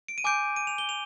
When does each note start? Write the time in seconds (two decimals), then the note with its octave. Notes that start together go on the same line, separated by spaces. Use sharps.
0.08 D7
0.18 D#7
0.24 G#5 D6 G6 D7
0.56 D#7
0.67 F7
0.78 G7
0.89 F7